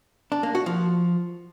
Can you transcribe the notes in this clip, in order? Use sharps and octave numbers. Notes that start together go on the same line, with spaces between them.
D4
A#3
F#4
F3